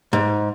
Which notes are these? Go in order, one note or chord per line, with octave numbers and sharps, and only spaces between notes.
G#2